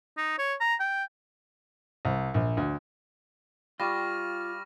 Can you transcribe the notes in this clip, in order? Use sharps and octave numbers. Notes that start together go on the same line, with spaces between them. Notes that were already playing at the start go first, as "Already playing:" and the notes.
D#4
C#5
A#5
G5
C2
A#1
D2
G3 F4 C#6 D6 F6 A#6